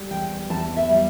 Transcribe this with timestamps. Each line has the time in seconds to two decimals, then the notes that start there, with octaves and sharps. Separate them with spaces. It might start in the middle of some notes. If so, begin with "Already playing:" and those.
Already playing: G3
0.11 E2 G5
0.50 E2 A5
0.77 E5
0.89 G3